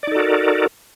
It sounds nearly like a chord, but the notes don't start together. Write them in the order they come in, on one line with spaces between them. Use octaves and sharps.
D5 D#4 A4 F#4 A#4